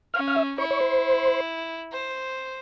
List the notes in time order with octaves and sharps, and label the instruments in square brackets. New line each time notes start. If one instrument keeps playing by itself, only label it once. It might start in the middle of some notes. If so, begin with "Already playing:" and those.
[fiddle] C#4 [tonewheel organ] F5
[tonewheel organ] F5
E5
[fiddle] E4 [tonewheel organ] C#5
[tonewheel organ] C#5
C5
[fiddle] C5